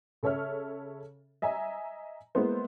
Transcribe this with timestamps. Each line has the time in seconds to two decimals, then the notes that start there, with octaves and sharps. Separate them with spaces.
0.23 C#3 A4 C#5 E5 F6
1.42 D#5 E5 G#5 A#5
2.35 G#3 A#3 B3 E4 C5